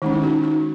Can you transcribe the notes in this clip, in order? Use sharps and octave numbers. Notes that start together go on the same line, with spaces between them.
D#3 G#3 C#4 D#4
E4
D#4 F#4
D#4